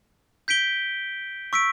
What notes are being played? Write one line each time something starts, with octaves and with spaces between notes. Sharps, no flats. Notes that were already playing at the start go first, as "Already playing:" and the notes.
G6 B6 D7 G7
C#6 E6 B6 D7